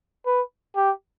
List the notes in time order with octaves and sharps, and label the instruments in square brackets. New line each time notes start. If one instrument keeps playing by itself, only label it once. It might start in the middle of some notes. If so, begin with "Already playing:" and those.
[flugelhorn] B4
G4